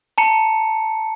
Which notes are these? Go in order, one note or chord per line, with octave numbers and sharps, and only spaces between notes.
A5 A#5 C#7